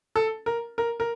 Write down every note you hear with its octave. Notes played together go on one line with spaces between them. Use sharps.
A4
A#4
A#4
A#4